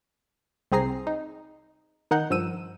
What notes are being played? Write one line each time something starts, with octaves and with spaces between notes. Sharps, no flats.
C2 C4 G#4 A#5 C7
D#4
D#3 D#4 F#5 G6
G2 F3 E6 D#7